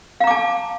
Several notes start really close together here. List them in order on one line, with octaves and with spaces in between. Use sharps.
F5 A#5 D6 A5